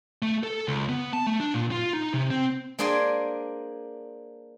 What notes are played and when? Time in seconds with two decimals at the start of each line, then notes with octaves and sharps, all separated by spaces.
0.22 A3
0.43 A4
0.68 C#2
0.89 B3
1.13 A5
1.27 A3
1.40 D4
1.54 A#2
1.72 F4
1.93 D#4
2.14 C3
2.31 C4
2.79 A#3 D4 G#4 C5 D5 G#5